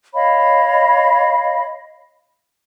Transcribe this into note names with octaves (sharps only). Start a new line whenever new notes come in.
C#5 D#5 F5 B5